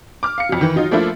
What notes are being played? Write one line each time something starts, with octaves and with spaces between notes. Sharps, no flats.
D6 F6
F5 C#7
F2 F#3
D#3 E3
F#3 D#4 F4
F3 A3 A#3 D4 E4 F4